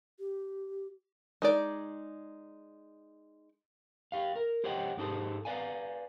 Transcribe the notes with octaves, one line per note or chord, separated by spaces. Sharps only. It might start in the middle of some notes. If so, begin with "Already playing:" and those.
G4
G#3 D#4 D5
G4 F5
A#4
G4 C5 C#5 D#5 F#5 G5
G#2 G#3 D#4 G4 A4 C5
B4 D5 F5 G#5